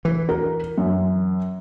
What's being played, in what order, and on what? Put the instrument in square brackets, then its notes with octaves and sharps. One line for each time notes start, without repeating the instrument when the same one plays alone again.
[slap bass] E3
[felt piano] A#4
F#2